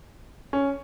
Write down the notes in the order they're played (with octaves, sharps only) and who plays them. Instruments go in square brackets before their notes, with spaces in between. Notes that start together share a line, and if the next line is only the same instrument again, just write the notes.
[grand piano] C#4